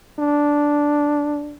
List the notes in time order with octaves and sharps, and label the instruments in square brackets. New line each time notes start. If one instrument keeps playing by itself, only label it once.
[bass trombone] D4